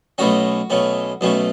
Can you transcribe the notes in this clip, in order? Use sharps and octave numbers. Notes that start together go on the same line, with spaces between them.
B1 B2 A3 C#4 F#4
B1 B2 A3 C#4
B1 B2 A3 C#4